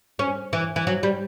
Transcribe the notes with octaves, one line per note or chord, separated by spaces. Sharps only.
C#4
E3
E3
F#3
G3